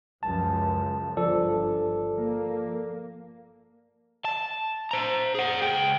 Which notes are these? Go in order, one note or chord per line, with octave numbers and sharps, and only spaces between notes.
C#2 F#2 F3 A5
G1 F3 A4 D5
A#3
A5
C5 A#5
G#4 F#5
C#2 G5